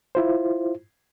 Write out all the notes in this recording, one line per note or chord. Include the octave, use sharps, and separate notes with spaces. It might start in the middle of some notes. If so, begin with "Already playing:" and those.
E4 F4 C5